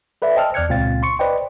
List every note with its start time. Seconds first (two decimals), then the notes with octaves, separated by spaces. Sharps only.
0.22 A4 B4 D5 E5
0.36 C5 D#5 G5 A5 E6 F6
0.54 E2 D5 F6 F#6 G#6 C#7
0.69 C#2 A#2 C4 F5 A6
1.03 C6 C#6 C#7
1.19 B4 C5 D5 D#5 G5